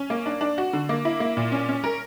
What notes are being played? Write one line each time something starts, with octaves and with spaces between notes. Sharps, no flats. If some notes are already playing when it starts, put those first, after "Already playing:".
Already playing: C#4
A#3
D4
D4
F#4
D3
A#3
E4
A#3
A#2
C#4
C#4
A#4